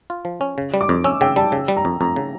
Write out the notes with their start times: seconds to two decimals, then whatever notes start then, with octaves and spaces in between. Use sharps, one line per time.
0.10 F4
0.25 F3
0.41 C#4
0.58 C#3
0.74 G3
0.81 D6
0.89 F2
1.04 C#4 E6
1.21 C#3 G5
1.36 G3 A5
1.52 C#3
1.68 G3
1.77 A#5
1.85 F2
2.01 F2 A#5
2.16 C#3